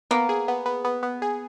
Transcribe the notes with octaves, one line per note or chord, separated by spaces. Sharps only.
A#3 B3
G#4
B3
B3
B3
B3
G#4